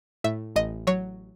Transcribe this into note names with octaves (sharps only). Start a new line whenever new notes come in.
A2 E5
A1 D#5
F#3 C#5